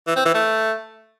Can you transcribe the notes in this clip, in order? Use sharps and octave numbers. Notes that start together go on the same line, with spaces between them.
E3
C4
E3
A3